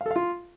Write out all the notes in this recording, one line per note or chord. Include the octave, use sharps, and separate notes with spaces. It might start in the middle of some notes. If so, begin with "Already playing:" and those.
F5
A4
F5
F4